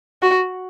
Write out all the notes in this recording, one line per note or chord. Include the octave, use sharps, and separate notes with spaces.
F#4